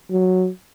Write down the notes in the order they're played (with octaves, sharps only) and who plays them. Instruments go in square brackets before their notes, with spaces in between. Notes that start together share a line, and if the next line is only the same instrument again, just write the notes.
[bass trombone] F#3